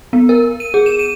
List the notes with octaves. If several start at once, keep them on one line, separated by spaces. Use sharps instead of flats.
B3
A#4
D#7
G#4
E7
D#7